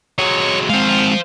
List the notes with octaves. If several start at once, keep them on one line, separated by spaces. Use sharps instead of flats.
F#3 G#3 C#5
G#3 C4 C5 F5